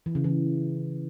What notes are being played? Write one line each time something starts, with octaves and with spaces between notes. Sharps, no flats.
E3
C#3
E3